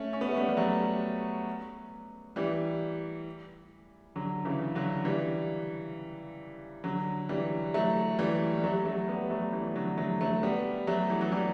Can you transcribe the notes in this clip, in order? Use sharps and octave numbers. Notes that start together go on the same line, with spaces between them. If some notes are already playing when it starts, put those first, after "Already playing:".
Already playing: A3 C#4
C#4
B3
A3
G3 B3
G3
F#3 A3
E3 G3
D3 F#3
C#3 E3
D3 F#3
E3 G3
D3 F#3
E3 G3
F#3 A3
E3 G3
G3
F#3 A3
F#3 A3
G3 B3
F#3 A3
E3 G3
D3 F#3
F#3 A3
F#3 A3
G3 B3
F#3 A3
E3
F#3
E3 G3